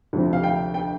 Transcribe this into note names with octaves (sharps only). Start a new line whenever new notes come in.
D2 C3 F3 C4
F5
G5
G5